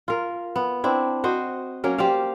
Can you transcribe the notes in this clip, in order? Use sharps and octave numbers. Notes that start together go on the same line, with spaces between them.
F4 A#4
B3
C4 D4 E4
F#4 C5 D#5
F#3 A#3 C#4 A#4
G4 C5 D5 F5